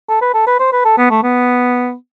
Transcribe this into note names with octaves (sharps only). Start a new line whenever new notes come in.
A4
B4
A4
B4
C5
B4
A4
B3
A3
B3